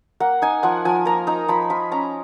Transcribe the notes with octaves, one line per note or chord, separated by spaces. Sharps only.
A#3 F#5
D#4 G#5
F3 F#5
F3 G#5
A#3 A#5
D#4 A#5
F3 B5
F3 B5
C#4 A#5